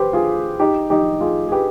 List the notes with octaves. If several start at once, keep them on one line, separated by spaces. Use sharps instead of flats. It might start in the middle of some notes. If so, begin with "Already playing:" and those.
Already playing: G4 B4 C5
F4 G#4
D#4 G4
D#4 G4
F4 G#4
G#4
G4 B4